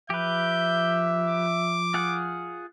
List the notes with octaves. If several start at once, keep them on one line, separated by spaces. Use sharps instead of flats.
F3 G4 B4 E5 G6
D6
F4 G#4 F#5